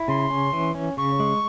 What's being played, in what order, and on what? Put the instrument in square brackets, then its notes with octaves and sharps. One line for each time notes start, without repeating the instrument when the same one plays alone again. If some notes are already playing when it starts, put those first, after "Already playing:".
Already playing: [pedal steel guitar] E4
[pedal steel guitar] C#3 [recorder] C6
[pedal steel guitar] C#4
E3
C#4
[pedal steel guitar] C#3 [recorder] C#6
[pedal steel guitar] G#3